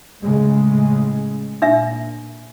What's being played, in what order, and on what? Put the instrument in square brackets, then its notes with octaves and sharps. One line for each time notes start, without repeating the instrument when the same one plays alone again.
[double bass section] A2 C#3 G#3
[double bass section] A#2 [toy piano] D4 E5